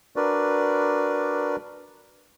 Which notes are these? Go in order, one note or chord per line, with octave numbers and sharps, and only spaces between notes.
D4 F#4 A#4 B4 D5